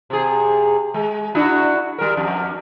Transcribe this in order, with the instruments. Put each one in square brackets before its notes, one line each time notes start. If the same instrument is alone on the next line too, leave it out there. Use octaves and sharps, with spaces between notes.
[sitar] C3 G#4
G#3
D4 E4 F#4
G3 A#4
F2